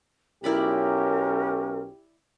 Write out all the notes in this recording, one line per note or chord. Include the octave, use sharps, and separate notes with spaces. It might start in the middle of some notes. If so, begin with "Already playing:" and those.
B1 C#4 E4 G4 A#4 D5 B5